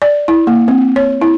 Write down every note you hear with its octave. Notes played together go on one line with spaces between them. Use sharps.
D5
E4
A#3
C4
C#5
E4